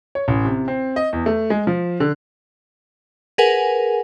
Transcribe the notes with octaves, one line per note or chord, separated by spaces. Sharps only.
C#5
A1
C3
C4
D#5
E2
A3
G#3
F3
D3
G#4 A#4 B4 F#5 G#5